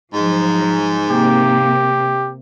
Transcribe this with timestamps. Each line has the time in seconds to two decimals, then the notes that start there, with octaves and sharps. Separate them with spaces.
0.14 G#2 F3 F#3
1.08 C3 A#3 G4